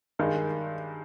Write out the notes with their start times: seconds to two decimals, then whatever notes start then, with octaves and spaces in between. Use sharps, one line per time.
0.19 G2 D#3 G#3 D#4